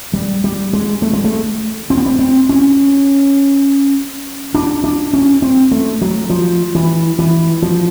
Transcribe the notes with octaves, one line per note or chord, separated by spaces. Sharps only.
G3
G3
G#3
A3
G#3
A3
C4
B3
C4
C4
C#4
D4
D4
C#4
C4
A3
F#3
F3
E3
E3
F3